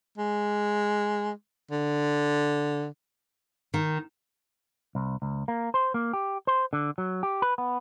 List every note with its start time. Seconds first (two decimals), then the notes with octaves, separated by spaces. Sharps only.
0.18 G#3
1.71 D3
3.74 D#3
4.95 C2
5.22 C#2
5.48 A#3
5.74 C5
5.94 A#3
6.13 G4
6.47 C5
6.73 D3
6.98 F#3
7.23 G4
7.42 B4
7.58 B3